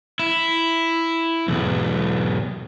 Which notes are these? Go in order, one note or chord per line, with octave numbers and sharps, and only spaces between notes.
E4
B1 E2